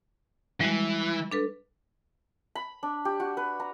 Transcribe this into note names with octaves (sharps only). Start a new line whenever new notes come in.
E3 G3 G#3 F#4
D4 A4 B4
B5
D4
G4
F#4
B4
A#5